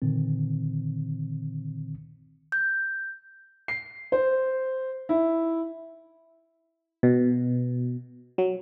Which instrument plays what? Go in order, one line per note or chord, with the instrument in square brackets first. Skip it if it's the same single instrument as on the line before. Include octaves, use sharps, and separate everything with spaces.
[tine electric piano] A#2 D3 D#3 C4
[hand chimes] G6
[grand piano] C7
C5
E4
[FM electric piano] B2
F#3